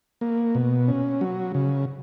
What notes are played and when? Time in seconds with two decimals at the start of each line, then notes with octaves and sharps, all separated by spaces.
0.21 A#3
0.55 B2
0.88 C#4
1.21 F#3
1.54 C#3